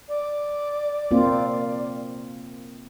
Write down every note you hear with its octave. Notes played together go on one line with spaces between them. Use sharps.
D5
A#3 C4 F4